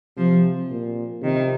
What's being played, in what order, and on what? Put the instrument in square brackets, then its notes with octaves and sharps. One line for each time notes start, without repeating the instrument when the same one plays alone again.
[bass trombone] C3 [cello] F3
[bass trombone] A#2
[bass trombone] C3 [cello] D#3